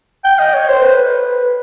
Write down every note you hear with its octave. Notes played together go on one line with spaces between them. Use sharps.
G5
D#5
C#5
C5
B4